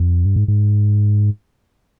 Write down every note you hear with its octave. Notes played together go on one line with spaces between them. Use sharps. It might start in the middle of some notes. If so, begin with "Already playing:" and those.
Already playing: F2
G2
G#2
G#2